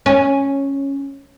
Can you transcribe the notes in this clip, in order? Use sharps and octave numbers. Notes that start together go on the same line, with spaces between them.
C#4